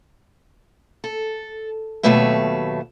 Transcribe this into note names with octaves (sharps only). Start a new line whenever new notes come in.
A4
D#2 B2 F#3 A3 B4 E5